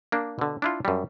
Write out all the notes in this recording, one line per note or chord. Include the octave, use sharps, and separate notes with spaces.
A#3 D4
B2 D3
D4 E4 F4
F#2 G3